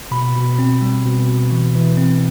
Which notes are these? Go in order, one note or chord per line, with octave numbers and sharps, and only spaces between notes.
B2 B5
B2
C4
G3
B2
B2
E3
E3
C4